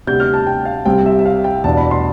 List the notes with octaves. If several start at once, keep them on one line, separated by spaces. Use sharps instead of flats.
D2 C3 G3 B3 D4 G6
F6
A5
G5
F5
C2 C3 G3 C4 G5
E5
E5
F5
G5
E2 B2 B3 D4 A5
B5
C6